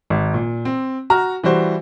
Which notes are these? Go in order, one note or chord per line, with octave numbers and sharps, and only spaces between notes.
G#1
A#2
C4
F#4 A#5 F6
E3 G3 F#4 C5